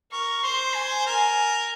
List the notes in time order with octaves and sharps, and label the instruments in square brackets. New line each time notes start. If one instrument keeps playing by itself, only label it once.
[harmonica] A#4 [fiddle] C#6
[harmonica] C5 [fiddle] C6
[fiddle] G#5
[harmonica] A#4 [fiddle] G#5